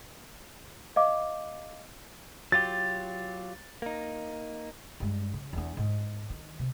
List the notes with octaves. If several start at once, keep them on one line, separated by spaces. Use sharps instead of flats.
D#5 F5 D6
F#3 F4 G4 A6
A#3 D#4
G2 G#3
C#3
E2 D4
G#2
D#3
C3